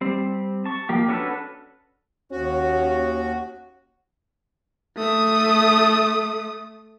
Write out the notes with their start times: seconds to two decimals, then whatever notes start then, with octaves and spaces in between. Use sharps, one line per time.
0.01 G3 C4
0.66 A5 C#6
0.89 F3 A#3 G4
1.09 C#4 D4 F#4 A4 B4
2.32 D#2 C#4 F#4
4.97 A3 D#6